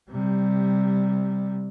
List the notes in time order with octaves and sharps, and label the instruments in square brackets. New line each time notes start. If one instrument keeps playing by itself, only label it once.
[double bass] C3 G3